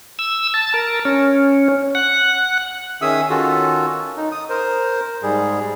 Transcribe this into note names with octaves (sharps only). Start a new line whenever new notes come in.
E6
A5
A#4
C#4
F#5
D#3 C#4 G#4 E5 D#6 E6
D#3 C#4 F4 F#4 A4
D#4
D#6
A#4 C5
G#2 G3 G#4